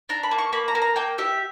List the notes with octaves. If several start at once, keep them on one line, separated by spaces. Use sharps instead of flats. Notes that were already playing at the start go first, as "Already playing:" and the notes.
D4 A#5
B5
A#3
C#6
A#3 B5
A#5
A#3
A#5
A#3 G5
G4 E5